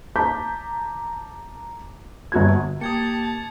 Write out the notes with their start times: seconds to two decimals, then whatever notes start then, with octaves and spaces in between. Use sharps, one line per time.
0.16 A5 A#5 D6 G6 B6
2.32 G1 F#4 G#6
2.81 A#3 G4 A5 D#6 G#6 C#7